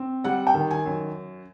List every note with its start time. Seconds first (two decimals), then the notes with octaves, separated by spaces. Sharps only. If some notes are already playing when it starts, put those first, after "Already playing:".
Already playing: C4
0.24 G3 F#5
0.47 G5
0.55 D#3
0.71 G#5
0.86 F#2